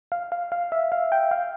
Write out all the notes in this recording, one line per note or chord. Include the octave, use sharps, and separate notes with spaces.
F5
F5
F5
E5
F5
G5
F5